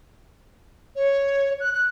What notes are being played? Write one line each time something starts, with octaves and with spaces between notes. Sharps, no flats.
C#5
F#6
F#6